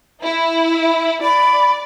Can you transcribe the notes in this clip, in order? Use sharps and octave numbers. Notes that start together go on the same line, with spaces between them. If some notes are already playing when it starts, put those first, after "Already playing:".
E4
D5 B5